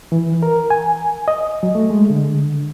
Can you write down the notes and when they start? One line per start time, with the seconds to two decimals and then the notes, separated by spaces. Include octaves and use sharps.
0.12 E3
0.43 A#4
0.70 G#5
1.28 D#5
1.63 F#3
1.75 A3
1.91 G#3
2.10 D3